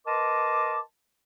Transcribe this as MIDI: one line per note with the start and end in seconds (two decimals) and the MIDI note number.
0.07 0.80 70
0.07 0.80 71
0.07 0.80 75
0.07 0.80 81
0.07 0.80 84
0.07 0.80 86